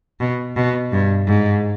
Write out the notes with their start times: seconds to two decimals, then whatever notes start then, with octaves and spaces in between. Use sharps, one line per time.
0.20 B2
0.57 B2
0.92 G2
1.28 G#2